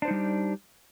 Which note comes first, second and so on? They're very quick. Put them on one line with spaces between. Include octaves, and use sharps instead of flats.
D4 C5 D#4 G3 G4